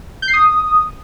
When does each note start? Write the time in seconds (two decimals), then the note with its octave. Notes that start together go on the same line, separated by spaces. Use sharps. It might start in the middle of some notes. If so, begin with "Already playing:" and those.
0.22 G6
0.28 C7
0.33 D#6